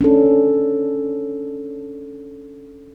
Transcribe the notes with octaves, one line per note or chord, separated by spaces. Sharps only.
C#4 D4 A4